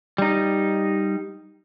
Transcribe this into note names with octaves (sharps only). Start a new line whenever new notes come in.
G3 D#4